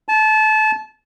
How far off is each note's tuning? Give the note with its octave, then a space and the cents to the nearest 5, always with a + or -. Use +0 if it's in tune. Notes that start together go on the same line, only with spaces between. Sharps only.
A5 -25